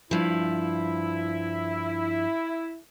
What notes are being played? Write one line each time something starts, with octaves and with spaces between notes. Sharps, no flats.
G2 F3 E4